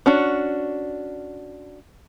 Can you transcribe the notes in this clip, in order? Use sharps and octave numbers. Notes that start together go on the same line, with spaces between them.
C#4 D4 F#4